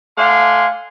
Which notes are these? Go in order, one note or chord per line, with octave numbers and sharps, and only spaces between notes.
A3 D5 F5 F#5 G#5 C6